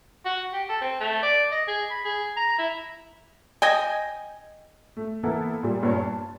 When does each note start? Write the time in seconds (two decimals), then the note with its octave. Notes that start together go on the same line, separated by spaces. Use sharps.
0.25 F#4
0.53 G4
0.69 A4
0.81 C4
1.00 A3
1.22 D5
1.51 D#5
1.67 G#4
1.90 B5
2.05 G#4
2.36 A#5
2.58 E4
3.62 D#5 G5 G#5
4.97 A3
5.23 E3 A#3 B3 E4 A4
5.63 A#2 G3
5.83 G2 A#2 C#5 A5
5.99 A5